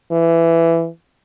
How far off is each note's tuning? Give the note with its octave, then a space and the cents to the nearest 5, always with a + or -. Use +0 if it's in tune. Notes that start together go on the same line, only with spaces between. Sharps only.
E3 +15